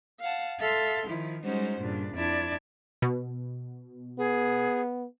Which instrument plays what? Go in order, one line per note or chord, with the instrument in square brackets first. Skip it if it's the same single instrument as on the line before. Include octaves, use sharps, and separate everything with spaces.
[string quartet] F5 F#5 A5
A4 E5 F5 C6
D#3 F3 E4
G3 G#3 C#4 D#4 F#4 C5
G2 A#2 C#3 D4
F2 D4 E4 D5 A5 G#6
[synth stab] B2
[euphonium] B3 [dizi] G#4